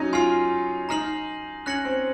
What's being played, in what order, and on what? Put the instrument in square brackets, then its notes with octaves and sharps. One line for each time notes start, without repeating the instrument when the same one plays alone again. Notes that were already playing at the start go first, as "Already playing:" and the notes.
Already playing: [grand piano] F#3 C#4 D#4
[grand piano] F4 [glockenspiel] G#5 C6 F6 C7
[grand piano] D#4 [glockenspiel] A#5 F6 C7 F#7
[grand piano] C#4 [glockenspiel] F#6 A#6 C#7 F#7
[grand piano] C4